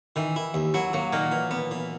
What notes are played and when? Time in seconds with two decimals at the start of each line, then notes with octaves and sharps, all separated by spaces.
0.16 D#3 E3
0.36 E4
0.54 D#2
0.74 F#3 E4
0.93 F#3 A#3
1.12 A#2 D#3 A#3
1.32 E3
1.51 B3
1.71 E3